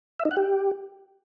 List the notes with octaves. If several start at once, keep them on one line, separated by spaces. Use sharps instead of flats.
E5
D#4
F#5
G4